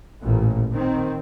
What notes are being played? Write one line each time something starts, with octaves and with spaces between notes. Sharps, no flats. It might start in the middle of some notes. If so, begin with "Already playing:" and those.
A1 A#2
D#3 C4